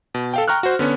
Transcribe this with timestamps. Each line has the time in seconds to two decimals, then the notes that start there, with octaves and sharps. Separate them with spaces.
0.14 B2
0.34 A4 F5 G5
0.48 G5 A#5 C#6 F6 F#6
0.63 F#4 C5
0.79 D3 B3 C#4